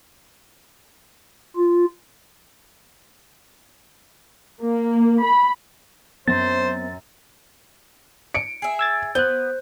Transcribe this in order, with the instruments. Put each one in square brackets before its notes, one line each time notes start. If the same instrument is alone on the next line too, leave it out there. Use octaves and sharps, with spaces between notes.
[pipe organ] F4
[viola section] A#3
B5
[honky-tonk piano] F#2 A#6 [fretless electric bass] B3 C4 [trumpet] C5 [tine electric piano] A6
[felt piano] C#7 D7
[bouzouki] G#4 E5
[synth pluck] E6 G#6 A6
[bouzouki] B3 [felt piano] C5 [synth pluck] F#6 G6